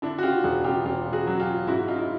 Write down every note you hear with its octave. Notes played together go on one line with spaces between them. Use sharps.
D3 D4 E4
F#4
F4 G4
E1 F#4 G#4
F4 G4
E1 F4 G4
F#4 G#4
F#3
F4 G4
G#2 E4 F#4
D#4 F4
E4